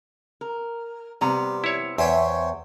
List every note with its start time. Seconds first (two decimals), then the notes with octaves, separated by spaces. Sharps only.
0.41 A#4
1.21 C3 G3 B3 A#5
1.64 E4 C#5
1.98 E2 C5 C#5 E5 G5